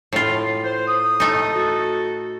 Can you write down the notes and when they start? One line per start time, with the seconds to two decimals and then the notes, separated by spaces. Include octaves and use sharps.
0.13 A2 F4
0.64 C5
0.87 D#6
1.20 A3 D#4
1.55 F#4 A4